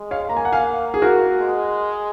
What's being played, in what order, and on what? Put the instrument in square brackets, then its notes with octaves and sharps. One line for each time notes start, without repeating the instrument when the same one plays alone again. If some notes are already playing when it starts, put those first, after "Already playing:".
Already playing: [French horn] G#3
[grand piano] C#5 F5
[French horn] A#3 [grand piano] A#5
[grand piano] G#5
F#5
F5 G#5
G#4
F#4 A#4
[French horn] G#3